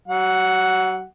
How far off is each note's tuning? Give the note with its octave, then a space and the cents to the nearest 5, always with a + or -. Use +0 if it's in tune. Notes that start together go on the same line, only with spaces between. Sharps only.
F#3 +30 F#5 +0